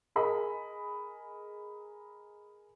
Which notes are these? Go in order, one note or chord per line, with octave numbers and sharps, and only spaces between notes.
G#4 A#4 D#5 B5